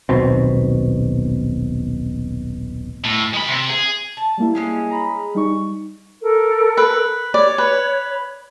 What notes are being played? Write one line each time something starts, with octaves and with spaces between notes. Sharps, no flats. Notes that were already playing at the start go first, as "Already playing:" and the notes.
D#1 B1 B2 C4
A2
G#3 B5
C3
G#4
A5
G3 A#3 E4
G#3 C#4 G#4
A#5 B5
G3 D#4 C#6
A4 A#4
B4
C#5 D5
B4